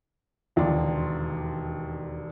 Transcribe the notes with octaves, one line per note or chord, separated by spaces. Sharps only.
E1 D#2 D3 D5 C6